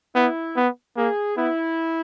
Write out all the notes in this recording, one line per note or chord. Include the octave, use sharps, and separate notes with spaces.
B3 E4
B3
A#3 G#4
B3 E4